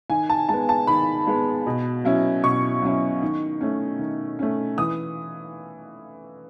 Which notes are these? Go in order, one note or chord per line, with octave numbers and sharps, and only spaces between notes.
D#3 G#5
A5
G#3 B3 A5
A5
D#3 B5
G#3 B3
B2
F#3 C#4 E4
B2 C#6
F#3 C#4 E4
D#3
A3 C#4
D#3
A3 C#4
E3 D#6